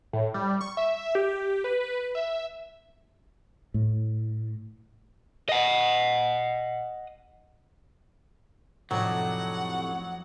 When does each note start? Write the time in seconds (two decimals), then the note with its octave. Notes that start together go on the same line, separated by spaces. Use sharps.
0.13 A2
0.34 G3
0.61 C#6
0.77 E5
1.15 G4
1.64 B4
2.15 E5
3.74 A2
5.49 D#5 F#5
8.91 F2 A2 C3 F#3 D4 D#4 F#5